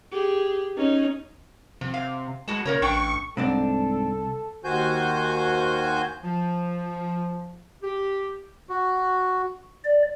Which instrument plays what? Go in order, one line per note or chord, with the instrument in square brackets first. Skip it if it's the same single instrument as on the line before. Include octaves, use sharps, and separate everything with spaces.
[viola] G4 G#4
C#4 D#4
[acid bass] C3 [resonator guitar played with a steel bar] F3
[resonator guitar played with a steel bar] F5
[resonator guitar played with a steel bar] A2 F#4 A5 [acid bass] G#3
[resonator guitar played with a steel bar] A#2 A#4 C#5 [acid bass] C#3
[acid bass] A1 [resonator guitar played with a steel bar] D4 G5 [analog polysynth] C#6
[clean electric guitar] C2 [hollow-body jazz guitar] G#2 C4 D4 [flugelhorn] A4
[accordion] D#2 D#3 F#4 C5 G#5 G6
[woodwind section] F3
G4
[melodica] F#4
[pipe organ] D5